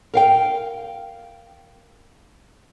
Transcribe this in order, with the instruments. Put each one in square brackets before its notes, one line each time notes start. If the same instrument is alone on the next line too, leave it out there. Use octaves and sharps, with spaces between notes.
[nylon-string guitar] A#4 F5 G5